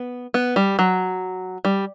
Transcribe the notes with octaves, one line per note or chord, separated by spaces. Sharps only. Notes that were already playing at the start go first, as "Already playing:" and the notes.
Already playing: B3
B3
G3
F#3
G3